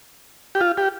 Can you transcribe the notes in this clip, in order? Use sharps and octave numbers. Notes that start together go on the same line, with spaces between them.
G4
F4
G4